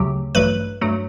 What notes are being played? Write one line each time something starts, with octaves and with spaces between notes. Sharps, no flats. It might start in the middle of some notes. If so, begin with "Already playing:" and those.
Already playing: D2 C#3 F#3 A3 G4
A1 G2 F#3 A3 B4
G2 F#3 A3